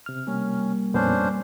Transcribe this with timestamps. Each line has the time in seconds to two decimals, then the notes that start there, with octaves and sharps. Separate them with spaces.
0.06 C3 F6
0.27 G3 A#3 C#4
0.94 F2 A#2 B3 C#4 D4 C5